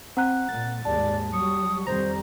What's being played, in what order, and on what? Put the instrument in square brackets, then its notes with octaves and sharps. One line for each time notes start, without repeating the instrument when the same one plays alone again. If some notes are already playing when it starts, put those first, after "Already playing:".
[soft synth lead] C4 [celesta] F#5 A#5 F#6
[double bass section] A#2 [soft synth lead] A6
[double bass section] D#2 G#2 G#3 [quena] D5 [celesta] A5
[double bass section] F#3 G3 [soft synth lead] C#6 [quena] D#6
[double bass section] F2 D#3 G3 [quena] C5 [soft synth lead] A#5